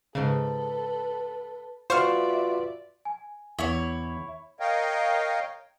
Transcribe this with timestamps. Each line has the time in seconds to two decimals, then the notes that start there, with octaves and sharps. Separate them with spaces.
0.15 G#2 C#3 A4 B4
1.90 F4 F#4 B4 C5 D5 E5 C#6 F6
3.05 G#5
3.59 E2 E4 C#5
4.60 A#4 C#5 D#5 F5 G5